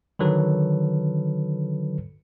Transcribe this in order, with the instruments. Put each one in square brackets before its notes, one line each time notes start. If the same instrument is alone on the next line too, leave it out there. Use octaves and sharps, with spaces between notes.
[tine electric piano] D3 D#3 F#3 A4 B4